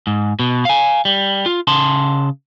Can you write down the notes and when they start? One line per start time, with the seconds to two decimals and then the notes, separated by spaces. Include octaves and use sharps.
0.07 G#2
0.39 B2
0.65 F5 G#5
1.05 G3
1.46 F4
1.67 C#3 A5 C6